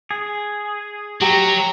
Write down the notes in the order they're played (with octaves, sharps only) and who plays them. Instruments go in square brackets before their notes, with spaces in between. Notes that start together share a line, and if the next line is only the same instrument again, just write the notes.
[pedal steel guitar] G#4
[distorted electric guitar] F#3 [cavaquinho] G4 [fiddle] A#5